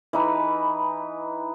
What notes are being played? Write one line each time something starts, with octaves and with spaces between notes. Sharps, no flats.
E3 D#4 B4